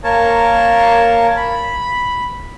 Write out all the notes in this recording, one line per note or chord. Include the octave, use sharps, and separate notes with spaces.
A#3 A#4 C#5 A5
B5